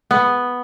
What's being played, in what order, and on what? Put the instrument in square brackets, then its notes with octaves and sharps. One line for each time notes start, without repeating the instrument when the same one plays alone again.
[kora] B3